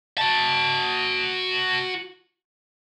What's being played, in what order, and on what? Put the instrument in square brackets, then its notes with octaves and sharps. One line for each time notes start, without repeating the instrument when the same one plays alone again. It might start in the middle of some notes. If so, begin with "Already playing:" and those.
[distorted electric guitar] F#4 A5